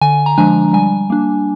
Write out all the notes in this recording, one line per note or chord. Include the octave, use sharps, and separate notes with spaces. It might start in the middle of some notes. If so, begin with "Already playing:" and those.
D3 G#5
A#5
F3 G#3 D4 G#5
G3 G#5
A#3 D4